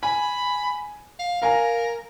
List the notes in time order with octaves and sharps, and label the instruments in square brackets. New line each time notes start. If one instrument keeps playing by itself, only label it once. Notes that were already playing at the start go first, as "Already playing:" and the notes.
[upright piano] G#5 [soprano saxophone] B5
[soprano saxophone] F5
[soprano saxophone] A#4 [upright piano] F5 G#5 A#5